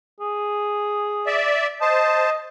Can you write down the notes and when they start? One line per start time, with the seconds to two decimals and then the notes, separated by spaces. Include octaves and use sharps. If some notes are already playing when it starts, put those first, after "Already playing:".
0.20 G#4
1.26 D5 E5
1.81 C5 D#5 A5